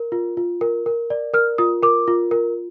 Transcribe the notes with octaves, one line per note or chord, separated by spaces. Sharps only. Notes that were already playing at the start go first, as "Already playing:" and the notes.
Already playing: A#4
F4
F4
A#4
A#4
D5
A#4 F6
F4 D#6
A#4 D6
F4
A#4